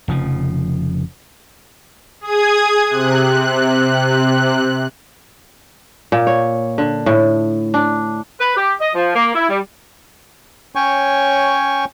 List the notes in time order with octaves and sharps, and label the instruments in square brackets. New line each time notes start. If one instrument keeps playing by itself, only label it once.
[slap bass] F1 C#3 F3
[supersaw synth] G#4 D#6 G#6
C3 F#6
[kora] A#2
C#5
D3
A2
D4
[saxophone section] B4
G4
D#5
F3
A#3
E4
G3
[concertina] C#4 C#5 G5 G#5 C#6